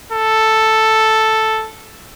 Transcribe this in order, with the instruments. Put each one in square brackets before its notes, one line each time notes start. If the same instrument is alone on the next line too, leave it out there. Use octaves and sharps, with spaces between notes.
[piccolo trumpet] A4